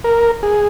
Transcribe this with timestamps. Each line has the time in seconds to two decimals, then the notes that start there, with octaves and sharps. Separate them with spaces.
0.04 A#4
0.43 G#4